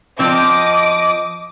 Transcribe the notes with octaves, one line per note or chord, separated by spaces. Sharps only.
F3 C4 D#5 D6 D#6